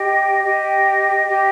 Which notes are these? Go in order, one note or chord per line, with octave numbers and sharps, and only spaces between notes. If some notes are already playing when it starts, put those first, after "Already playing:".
Already playing: G4 D#5 G5
G4 D#5 G5
G4 D#5 G5